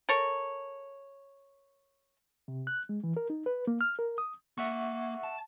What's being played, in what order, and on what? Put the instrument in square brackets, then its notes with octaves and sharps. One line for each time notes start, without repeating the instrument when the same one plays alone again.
[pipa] A4 A#4 C#5
[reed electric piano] C3
F#6
G#3
E3
A#4
D#4
B4
A#3
F6
A#4
D#6
[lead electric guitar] A#3 [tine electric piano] E5 F#5 C#6
[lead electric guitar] A5